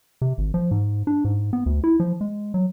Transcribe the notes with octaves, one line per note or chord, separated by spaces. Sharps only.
C3
G#1
F3
G#2
D4
G#2
B3
D2
E4
F3
G#3
F#3